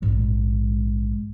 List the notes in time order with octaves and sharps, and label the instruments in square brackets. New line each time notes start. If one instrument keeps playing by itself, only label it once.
[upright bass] A#1 G#2